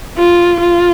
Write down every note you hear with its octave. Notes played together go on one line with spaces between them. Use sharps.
F4
F4